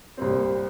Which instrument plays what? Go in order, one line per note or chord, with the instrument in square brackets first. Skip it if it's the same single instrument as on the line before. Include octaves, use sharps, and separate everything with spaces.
[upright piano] C2 A#2 G3 C4